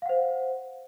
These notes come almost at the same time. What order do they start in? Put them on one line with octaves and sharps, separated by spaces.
F5 F#5 C5